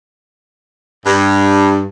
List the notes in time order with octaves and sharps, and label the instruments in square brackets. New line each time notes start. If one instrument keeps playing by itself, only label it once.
[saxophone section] G2